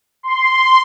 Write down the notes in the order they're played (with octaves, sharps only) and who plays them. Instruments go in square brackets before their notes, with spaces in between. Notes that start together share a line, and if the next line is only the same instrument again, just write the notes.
[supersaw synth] C6